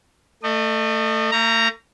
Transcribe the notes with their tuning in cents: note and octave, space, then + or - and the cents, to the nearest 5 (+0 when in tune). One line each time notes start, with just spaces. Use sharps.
A3 +20 D#5 -30
A3 +45 A#5 -5